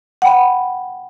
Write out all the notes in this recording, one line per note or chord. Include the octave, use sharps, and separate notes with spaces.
F#5 G5 B5